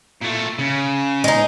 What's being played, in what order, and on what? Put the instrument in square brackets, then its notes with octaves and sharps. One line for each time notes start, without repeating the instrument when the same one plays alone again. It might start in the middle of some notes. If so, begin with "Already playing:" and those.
[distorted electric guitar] A#2 A3
C#3
[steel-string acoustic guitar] G#3 D#4